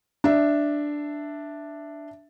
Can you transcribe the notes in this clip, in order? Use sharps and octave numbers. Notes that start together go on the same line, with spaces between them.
D4 E5